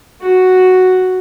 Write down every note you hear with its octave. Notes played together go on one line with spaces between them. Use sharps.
F#4